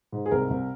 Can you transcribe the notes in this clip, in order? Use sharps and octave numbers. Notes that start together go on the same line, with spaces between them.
G#2
G#4
C2 A#4
C2